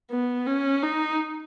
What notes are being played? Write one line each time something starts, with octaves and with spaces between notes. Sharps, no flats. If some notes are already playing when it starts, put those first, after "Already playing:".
B3
C#4
D#4